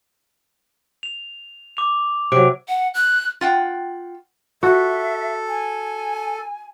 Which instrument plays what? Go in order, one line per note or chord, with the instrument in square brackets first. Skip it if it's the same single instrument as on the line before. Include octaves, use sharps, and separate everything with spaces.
[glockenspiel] F7
D6 F7
[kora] C3 F#3 [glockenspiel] D6 D7
[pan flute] F#5
F#6
[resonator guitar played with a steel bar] F4 F#5 G5
[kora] F#4 [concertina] A4 [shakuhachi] E5
[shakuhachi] G#5